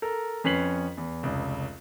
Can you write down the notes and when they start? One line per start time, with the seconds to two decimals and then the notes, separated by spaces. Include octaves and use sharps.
0.02 A4 A#4
0.44 F2 C#4 B4 B6 C7 F#7
0.97 E2
1.23 F1 C#2